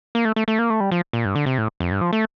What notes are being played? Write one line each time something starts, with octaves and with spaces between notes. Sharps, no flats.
A#3
A3
A3
A3
A#3
A3
G3
F3
A#2
G2
D3
C3
A2
F2
G2
F3
A3